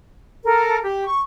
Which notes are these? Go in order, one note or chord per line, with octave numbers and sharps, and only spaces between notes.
A4 A#4
G4
C#6